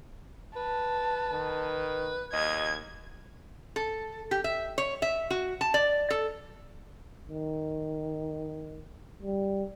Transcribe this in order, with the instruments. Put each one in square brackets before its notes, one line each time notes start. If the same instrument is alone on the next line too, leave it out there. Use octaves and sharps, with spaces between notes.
[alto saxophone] B4 [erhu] A5
[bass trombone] D#3
[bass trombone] D#2 [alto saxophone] D#5 [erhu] G#6
[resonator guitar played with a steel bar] A4
G4
E5
C#5
E5
F#4
A5
D5
A4
[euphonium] D#3
G3